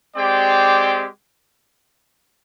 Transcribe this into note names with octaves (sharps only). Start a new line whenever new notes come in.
G#3 C4 G4 D5 G5